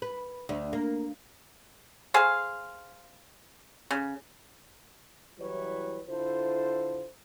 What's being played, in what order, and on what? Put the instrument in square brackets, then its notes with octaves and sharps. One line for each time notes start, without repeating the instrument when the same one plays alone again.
[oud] B4
D2
A#3
[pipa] G#4 C5 F5
C#3
[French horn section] E3 F#3 G3 E4 B4 C#5
D3 E4 F4 A4 C5